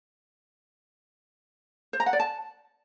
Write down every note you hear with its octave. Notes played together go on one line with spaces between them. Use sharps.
C5
A#5
F#5
D5
A5